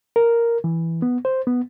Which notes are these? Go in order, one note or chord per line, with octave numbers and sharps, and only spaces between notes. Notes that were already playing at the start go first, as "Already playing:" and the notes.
A#4
E3
B3
C5
B3